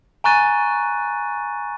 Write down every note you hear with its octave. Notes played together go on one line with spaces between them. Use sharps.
G#5 A#5 C#6 F#6 A6 D#7